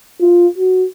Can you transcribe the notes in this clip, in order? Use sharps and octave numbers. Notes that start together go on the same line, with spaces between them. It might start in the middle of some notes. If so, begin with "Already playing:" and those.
F4
F#4